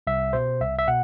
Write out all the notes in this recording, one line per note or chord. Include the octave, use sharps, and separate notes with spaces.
C2 E5
B2 C5
C2 E5
E5
B2 F#5